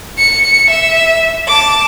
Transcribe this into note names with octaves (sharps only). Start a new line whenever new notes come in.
C#7
E5
A5 D6